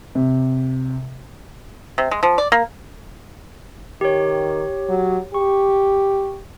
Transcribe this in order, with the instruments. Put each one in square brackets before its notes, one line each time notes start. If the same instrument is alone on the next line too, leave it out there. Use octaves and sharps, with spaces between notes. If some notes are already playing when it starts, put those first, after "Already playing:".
[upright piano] C3
[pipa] C3
G#3
F3
D5
A#3
[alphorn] D#3 [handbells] G4 C#5
[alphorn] F#3
[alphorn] G4 [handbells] C#6